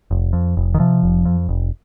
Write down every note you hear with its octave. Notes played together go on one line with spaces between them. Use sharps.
F1
F2
F1
D#3
C3 F3
F1
F2
F1